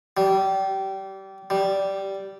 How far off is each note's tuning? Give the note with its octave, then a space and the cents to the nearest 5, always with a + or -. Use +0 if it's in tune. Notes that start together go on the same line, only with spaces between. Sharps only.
G3 -25
G3 -10